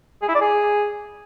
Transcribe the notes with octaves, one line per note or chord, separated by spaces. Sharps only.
G#4
E4
D5
G#4